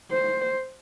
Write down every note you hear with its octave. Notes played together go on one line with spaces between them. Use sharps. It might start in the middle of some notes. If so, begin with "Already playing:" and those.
C5